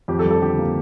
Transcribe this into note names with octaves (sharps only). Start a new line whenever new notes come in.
F2 G4
A4
G3
A4
D3 G4
A#3